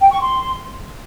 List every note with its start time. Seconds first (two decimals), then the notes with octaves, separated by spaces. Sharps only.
0.01 G5
0.10 C#6
0.20 C6